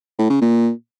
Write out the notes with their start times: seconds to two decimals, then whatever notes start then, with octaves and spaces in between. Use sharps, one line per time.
0.19 A2
0.30 C#3
0.41 A#2